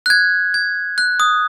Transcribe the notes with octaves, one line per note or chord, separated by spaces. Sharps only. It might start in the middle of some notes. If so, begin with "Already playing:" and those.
F#6
G#6
G#6
F#6
D#6